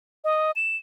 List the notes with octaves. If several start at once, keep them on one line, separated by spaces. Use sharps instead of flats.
D#5
E7